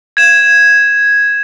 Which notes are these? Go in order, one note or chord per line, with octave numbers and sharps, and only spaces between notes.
G#6 E7